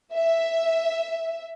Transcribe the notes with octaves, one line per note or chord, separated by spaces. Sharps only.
E5